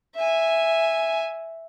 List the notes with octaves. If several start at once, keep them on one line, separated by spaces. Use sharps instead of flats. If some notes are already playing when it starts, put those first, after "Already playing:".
E5 G#5